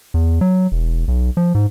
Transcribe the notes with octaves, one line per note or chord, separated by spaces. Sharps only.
E2
F#3
E1
B1
F3
G#2